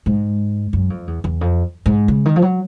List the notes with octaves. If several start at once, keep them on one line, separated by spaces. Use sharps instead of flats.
G#2
F#2
F2
E2
E2
F2
G#2
C#3
D#3
F3
F#3